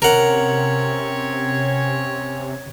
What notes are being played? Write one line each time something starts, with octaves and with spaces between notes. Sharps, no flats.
C3 C4 C#4 A#4 C#5 F#5